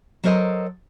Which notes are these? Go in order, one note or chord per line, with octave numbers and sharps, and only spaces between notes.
F#3 A4 A#4 C5 D#5